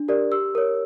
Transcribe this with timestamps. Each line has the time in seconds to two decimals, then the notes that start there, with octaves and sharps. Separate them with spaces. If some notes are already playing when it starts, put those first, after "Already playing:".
Already playing: D4
0.08 G4 A#4 D5
0.32 G4 E6
0.55 A#4 C#5